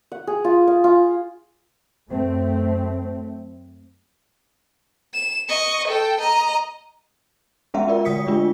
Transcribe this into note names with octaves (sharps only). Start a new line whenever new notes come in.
F#5
G#4
F4
F5
F4
F#2 A3 C4
E7
D#5 C#6
A4 G5
D#5 A#5
G#3 B3 C#4 F#4 E5 F#5
F4 A#4 D5
D3 G#3 D#6 B6 C#7
G#3 A3 D4 F4